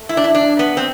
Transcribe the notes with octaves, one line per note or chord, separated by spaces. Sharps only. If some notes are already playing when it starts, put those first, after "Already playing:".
Already playing: A3
E4
D4
E4
D4
B3
C4